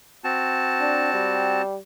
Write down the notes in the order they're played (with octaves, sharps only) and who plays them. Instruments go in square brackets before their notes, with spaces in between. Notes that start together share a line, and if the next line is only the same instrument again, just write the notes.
[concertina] C4 F#4 A5
[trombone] D4
G3